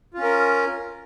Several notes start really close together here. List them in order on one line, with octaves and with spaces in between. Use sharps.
F4 C#4 A#4